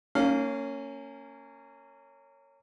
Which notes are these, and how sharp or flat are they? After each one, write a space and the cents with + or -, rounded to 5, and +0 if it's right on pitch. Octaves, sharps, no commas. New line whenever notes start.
A#3 -30 C#4 +0 F5 +0